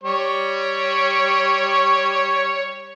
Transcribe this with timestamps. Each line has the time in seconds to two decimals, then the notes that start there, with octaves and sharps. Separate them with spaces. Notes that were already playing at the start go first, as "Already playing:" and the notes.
0.03 G3 C#5 C#6